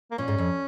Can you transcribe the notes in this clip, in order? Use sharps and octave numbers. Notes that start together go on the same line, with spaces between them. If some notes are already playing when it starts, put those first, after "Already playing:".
A#3
A#2 C#4
G#2
F2